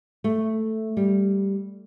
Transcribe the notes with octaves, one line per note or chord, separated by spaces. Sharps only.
A3
G3